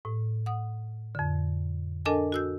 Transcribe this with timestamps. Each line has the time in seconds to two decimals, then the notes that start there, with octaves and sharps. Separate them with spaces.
0.05 A2
0.46 F#5 D#6
1.15 F2 D3
2.05 D4 A4 A#4 D#5 G#5 A5
2.32 F#4 E6 G6